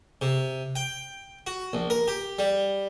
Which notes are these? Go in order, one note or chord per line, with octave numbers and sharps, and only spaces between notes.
C3
G5
F#4
A#1
A#4
G4
G3